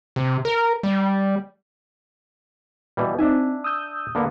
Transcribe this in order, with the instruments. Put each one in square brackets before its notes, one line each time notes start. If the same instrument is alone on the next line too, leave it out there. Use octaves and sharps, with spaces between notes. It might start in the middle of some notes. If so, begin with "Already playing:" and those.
[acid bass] C3
A#4
G3
[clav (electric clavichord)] B2 E3 G3
[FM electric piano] C4 D#4 [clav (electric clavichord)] D4 E5 G#5
[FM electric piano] D#6 E6 G6
[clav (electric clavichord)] D3 A#3 B3